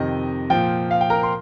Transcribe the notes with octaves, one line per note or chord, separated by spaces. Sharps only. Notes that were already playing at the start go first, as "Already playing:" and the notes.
Already playing: F2 C3 D#3 D#5
A#2 F3 G5
F5
G5
A#4 A#5
C6